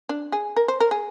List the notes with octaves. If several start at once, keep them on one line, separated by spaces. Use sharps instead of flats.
D4
G#4
A#4
C5
A#4
G#4